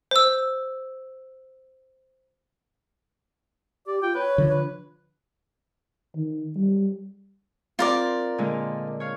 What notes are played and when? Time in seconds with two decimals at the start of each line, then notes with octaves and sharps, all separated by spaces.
0.11 C5 E6
3.87 G4 D5
4.02 F4 G5
4.15 B4 C#5
4.38 D3 F3
4.50 B4
6.16 D#3
6.56 G3
7.79 C4 F4 A#4 D5
8.38 A#2 D3 G#3
9.00 C#5 F5